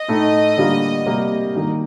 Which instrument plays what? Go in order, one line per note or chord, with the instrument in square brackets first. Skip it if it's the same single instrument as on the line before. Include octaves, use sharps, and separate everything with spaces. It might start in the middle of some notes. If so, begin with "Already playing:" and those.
Already playing: [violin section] D#5
[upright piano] A2 A3 D#4
D3 G3 A#3 F4
C3 G3 A#3
D#3 G3 A#3 D#4